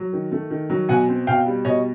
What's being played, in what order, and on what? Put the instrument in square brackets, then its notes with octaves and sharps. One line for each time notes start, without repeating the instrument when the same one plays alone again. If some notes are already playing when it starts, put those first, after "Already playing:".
Already playing: [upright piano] F#3
D#3
A3
D#3
F#3
B2 F#5 G#5
C4
B2 F5 G5
G3
B2 C#5 D#5